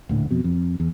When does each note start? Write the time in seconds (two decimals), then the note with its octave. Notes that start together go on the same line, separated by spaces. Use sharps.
0.09 D#1 A2 D3
0.31 F2 B2
0.44 F2
0.80 E2